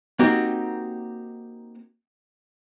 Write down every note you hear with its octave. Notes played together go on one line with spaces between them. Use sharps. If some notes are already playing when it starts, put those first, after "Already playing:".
A#3 C4 D#4 F#4 G4